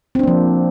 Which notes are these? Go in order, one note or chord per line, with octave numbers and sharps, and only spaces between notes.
F3 A#3 C4 D4